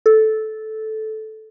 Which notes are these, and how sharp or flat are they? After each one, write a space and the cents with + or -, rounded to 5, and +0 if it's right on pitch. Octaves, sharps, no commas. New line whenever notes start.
A4 -10